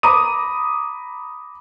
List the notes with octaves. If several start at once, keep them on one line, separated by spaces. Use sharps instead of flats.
A#5 B5 D6 D#6 D#7